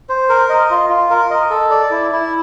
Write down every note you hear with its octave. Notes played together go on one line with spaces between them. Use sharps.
C5
A#4
D#5
F4
F4
A#4
D#5
A4
D5
E4
E4